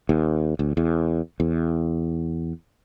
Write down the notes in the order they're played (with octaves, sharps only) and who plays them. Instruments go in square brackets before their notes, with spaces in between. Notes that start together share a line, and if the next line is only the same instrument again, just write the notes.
[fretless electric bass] D#2
D2
E2
E2